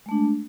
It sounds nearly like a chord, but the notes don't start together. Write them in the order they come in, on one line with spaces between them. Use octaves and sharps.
G#3 A3 D4